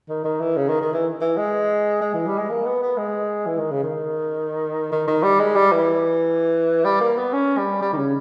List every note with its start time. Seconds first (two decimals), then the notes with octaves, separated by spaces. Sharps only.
0.09 D#3
0.24 D#3
0.40 E3
0.57 C#3
0.69 D#3
0.81 D#3
0.93 E3
1.21 E3
1.37 G#3
2.01 G#3
2.14 E3
2.26 G3
2.37 G#3
2.50 A#3
2.66 B3
2.82 B3
2.98 G#3
3.46 E3
3.59 D#3
3.71 C#3
3.83 D#3
4.92 D#3
5.07 D#3
5.23 G3
5.39 G#3
5.55 G3
5.72 E3
6.85 G3
7.00 A#3
7.18 B3
7.33 C#4
7.58 G3
7.81 G3
7.93 D#3
7.97 C#3